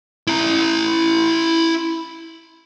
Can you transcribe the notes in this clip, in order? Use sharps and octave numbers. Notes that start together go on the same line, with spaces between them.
E4 A#5